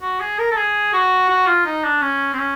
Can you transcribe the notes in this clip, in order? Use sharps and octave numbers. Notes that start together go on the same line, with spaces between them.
F#4
G#4
A#4
A4
G#4
F#4
F#4
F4
D#4
D4
C#4
C4
C#4